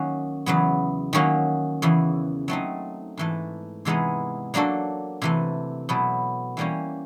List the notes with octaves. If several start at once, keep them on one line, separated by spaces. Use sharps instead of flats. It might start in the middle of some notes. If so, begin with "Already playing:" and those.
Already playing: D#3 F#3 A#3 C#4 F#4
E2 C#3 F#3 B3
D#3 F#3 A#3 C#4 F#4
E2 C#3 E3
F#3 A3 C4 D#4
G#2 E3 A3
C3 E3 G#3 B3 D#4
F#3 A#3 D4 F#4 A4
C3 E3 A3
B2 F#3 B3 E4
E3 G3 A#3 C#4